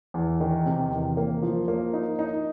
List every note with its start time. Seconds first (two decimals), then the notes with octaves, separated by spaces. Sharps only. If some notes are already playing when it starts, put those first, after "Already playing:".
0.14 E2
0.40 D#3
0.66 C3
0.91 E2
1.17 A#3
1.42 F3
1.68 A#3
1.93 D#4
2.19 D#4